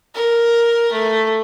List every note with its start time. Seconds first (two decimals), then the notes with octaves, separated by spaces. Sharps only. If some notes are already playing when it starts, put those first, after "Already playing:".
0.15 A#4
0.92 A3